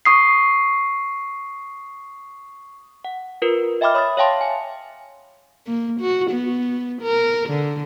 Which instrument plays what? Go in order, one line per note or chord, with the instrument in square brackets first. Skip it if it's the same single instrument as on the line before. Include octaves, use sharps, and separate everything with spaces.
[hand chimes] C#6 D#6 C7
[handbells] F#5
F4 A#4 B4
D#5 E5 G5 B5 D6 F6
C#5 B5 D#6 F6 A6
C#5 E5 F5 G5 A5 C6
G#5
[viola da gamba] A#3
F#4
B3
A#4
D3